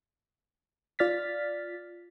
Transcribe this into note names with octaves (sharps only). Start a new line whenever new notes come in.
F4 D5 F6 A6 B6